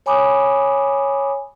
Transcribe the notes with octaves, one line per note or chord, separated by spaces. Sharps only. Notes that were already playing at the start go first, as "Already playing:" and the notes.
C#5 G#5 B5 D6 D#6